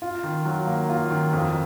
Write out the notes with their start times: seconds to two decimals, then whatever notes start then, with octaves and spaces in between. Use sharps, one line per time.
0.02 F4
0.24 D#3
0.45 F#3
0.67 A#3
0.89 F4
1.11 D#3
1.33 F2